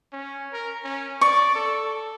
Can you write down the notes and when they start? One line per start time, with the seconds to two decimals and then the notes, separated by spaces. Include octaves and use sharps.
0.13 C#4
0.53 A#4
0.84 C#4
1.21 D5 C#6
1.55 A4